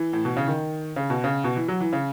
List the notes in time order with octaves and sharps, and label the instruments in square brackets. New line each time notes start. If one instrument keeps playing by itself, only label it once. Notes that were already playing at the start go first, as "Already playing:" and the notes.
Already playing: [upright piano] E3
A2
B2
C#3
D#3
C#3
B2
C#3
B2
E3
F#3
E3
C#3